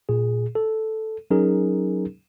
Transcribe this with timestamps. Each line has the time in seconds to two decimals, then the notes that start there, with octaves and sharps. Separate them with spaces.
0.09 A#2 G#4
0.55 A4
1.31 F#3 C#4 D#4 G#4 A#4